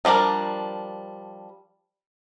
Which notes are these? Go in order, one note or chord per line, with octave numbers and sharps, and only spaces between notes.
F3 G3 D4 A#4